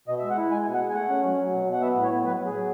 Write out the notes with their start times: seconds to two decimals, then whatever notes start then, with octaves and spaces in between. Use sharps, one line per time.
0.08 B2 D#5
0.18 G#3 E5
0.30 F#5
0.37 E4
0.51 G#3 G#5
0.66 B2
0.74 F#5
0.80 G#3
0.89 G#5
0.94 A3 F#5
1.09 C#4
1.23 F#3
1.38 F#3
1.53 B2
1.66 B2
1.73 F#5
1.81 B3 E5
1.96 A2
2.03 C#5
2.11 B3
2.25 F#3 B4
2.40 F#3
2.46 G#4
2.53 F#3